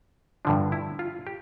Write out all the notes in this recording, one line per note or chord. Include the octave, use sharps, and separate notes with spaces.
G2 D3 F3 D4
E4
F4
G4